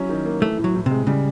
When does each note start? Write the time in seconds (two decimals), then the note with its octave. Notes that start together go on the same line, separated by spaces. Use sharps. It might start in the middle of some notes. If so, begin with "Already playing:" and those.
Already playing: F#3 C#4 E4
0.09 D#3
0.25 A#3
0.42 E3 A3
0.58 A2
0.64 F#3
0.75 A2
0.86 C3 G#3
1.07 C#3 G3